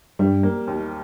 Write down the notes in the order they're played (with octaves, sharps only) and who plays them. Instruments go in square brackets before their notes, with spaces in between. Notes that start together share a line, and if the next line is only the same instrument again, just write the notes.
[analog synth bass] G2 [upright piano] G3
[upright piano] A#3
D#2